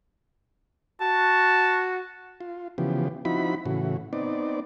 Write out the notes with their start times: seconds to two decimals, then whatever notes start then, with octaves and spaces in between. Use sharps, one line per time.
1.01 F#4 A5
2.41 F4
2.78 C#3 E3 F3 B3 G4
3.25 F3 C4 D#4 E4 F#4 B5
3.66 A2 C#3 E3 F#4
4.13 B3 C4 D#4 D5